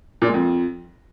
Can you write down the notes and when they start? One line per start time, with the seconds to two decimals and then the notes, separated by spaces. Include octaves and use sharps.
0.22 A#2
0.28 G#3
0.34 F2